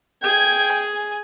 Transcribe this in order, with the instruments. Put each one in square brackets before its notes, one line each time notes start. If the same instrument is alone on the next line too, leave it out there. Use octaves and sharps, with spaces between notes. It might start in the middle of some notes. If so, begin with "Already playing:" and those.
[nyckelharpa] G#4 [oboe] G5 [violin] G#6
[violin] G#5